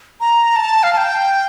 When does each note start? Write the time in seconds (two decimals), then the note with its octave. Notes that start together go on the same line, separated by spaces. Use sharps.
0.20 A#5
0.56 A5
0.83 F5
0.93 A5
0.97 G5